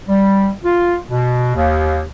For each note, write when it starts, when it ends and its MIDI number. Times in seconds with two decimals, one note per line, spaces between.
0.08 0.50 55
0.63 0.95 65
1.10 1.54 47
1.55 2.01 39